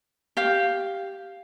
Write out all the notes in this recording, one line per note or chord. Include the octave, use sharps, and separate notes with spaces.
G4 F5